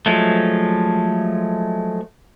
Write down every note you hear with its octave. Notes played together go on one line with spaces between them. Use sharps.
F3 F#3 G#3 A3